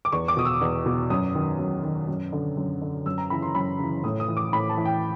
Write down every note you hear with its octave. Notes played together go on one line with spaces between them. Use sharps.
D6
E2 C#6
D6
B2 D#6
E6
E2
B2
F#2 D#6
D#3
F#2
D#3
F#2
D3
F#2
D3
F#2 E6
A#5
C#3 E3 B5
C6
F#2 B5
C#3 E3
A2 D#6
D#6
E3
D6
A2 B5
A5
E3
G5